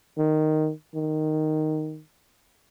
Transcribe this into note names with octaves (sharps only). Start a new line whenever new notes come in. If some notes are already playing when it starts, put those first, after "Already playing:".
D#3
D#3